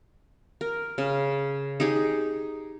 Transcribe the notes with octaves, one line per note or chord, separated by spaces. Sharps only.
A#4
C#3
D#4 G4 G#4